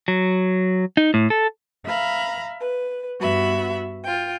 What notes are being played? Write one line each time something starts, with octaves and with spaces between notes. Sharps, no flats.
F#3
D#4
A2
A4
E5 F5 A#5 B5
B4
G2 B3 F#4 E5 B5
F4 G5